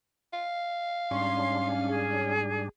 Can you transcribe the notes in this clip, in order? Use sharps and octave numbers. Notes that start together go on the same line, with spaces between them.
F5
G#2 G3 C#4 D4 C6
G#4